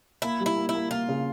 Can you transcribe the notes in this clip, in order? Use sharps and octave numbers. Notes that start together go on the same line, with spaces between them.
A#3 E4
G3
E4
A#3
E4
A#3
A#3 F4
C#3